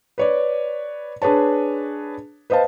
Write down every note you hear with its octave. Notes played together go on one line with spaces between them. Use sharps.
B4 C#5 D5
D4 G#4 B4 C#5 A5
B4 C5 D#5 F5 A5